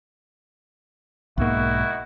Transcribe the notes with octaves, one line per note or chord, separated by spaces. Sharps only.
B1 G#2 D#3 A#3 E4 F#4